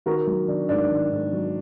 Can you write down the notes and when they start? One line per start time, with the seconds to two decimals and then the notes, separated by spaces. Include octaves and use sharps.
0.06 D#3 F#4 A#4
0.27 F#3
0.48 D#3 D4
0.69 G#2 D4
0.91 D#3
1.11 G#2
1.33 F#3